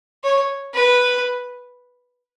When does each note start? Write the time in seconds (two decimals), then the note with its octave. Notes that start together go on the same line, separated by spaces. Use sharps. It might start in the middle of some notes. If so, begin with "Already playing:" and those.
0.24 C#5
0.74 B4